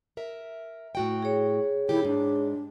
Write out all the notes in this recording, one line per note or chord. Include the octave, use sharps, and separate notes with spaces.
A#4 E5
A2 F#4 G5
G#4 C#5
A#2 D#3 E4 G4
G#2 D4